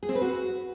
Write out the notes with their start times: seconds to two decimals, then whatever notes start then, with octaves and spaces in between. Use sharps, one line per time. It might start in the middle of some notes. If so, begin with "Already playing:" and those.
0.03 G#4
0.09 C4
0.15 B4
0.21 F#4